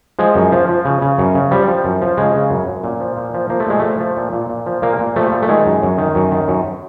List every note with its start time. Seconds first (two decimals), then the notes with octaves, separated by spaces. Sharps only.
0.19 F3 G#3
0.35 F#2
0.52 F3
0.69 F3
0.85 C#3
1.02 C#3
1.18 F#2
1.35 C#3
1.51 F3 G3
1.68 F3
1.84 F#2
2.01 F3
2.17 C#3 G#3
2.34 C#3
2.50 F#2
2.67 F#2
2.84 A#2
3.00 F3
3.17 A#2
3.34 F3
3.50 F3 A#3
3.60 A3
3.67 A#2 G#3
3.79 F3 A3
4.00 F3
4.17 A#2
4.33 A#2
4.50 A#2
4.66 F3
4.82 A#2 A#3
4.99 A#2
5.16 F3 A3
5.32 A#2
5.42 A3
5.48 D#3 G#3
5.66 F#2
5.82 F#2
5.98 D#3
6.15 F#2
6.32 D#3
6.48 F#2